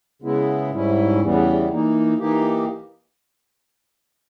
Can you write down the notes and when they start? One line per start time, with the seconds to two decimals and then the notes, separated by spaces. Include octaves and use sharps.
0.22 C#3 G#3 B3 E4
0.71 G#2 G3 C#4 E4
1.21 E2 C#3 E3 G3 B3
1.69 E3 A#3 D#4
2.18 E3 A#3 D#4 G4